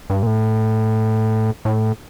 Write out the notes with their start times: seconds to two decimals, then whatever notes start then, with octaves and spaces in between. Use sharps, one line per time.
0.10 G2
0.23 A#2
0.27 A2
1.65 A2